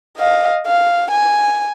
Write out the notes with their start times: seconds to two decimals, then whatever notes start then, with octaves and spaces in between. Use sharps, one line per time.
0.18 D#5 F5
0.67 F5
1.11 G#5